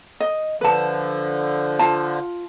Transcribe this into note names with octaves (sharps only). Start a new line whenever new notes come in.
D#5
D3 F3 B4 A5
F4 A5